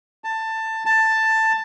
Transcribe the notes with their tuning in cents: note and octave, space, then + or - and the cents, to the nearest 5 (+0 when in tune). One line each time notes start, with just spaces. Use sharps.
A5 +15
A5 +10